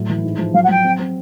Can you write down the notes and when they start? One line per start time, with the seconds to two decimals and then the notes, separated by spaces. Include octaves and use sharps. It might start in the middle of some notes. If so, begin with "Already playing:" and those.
Already playing: A2 F#3
0.09 E3
0.23 G#2
0.38 F3
0.54 F#3 F5
0.63 F#5
0.69 F#3 G5
0.84 C4
0.99 C4